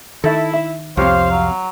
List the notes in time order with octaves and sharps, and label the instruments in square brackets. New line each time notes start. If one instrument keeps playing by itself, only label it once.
[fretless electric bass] D#3 [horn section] E4 [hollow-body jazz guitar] A4 E5
[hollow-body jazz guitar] E5
[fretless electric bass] C2 C4 [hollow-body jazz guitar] F2 G4 C#5 [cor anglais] C5 [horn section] F5
[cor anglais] F#3